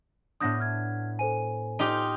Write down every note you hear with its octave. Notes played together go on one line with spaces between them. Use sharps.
A2 B3 D4 D#6 G6 A#6
F6 G#6
A4 C5 G#5 D#7
D#4 F4 G4